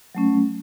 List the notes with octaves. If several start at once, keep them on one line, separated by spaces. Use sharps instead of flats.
F#3 A3 C#4